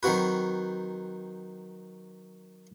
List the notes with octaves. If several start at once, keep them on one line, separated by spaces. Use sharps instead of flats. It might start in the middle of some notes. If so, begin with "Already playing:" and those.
D#3 F#3 C4 F#4 B4